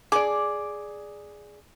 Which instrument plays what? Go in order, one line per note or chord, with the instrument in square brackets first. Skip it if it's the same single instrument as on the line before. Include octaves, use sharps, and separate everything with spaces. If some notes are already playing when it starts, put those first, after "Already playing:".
[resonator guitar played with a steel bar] G#4 D5 [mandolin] D6